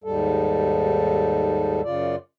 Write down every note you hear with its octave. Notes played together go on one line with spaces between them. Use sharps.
D#2 G#2 G3 A4
F#2 C#3 F4 D5